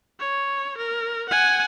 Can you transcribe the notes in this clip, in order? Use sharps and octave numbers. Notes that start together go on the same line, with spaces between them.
C#5
A#4
F#5 G#5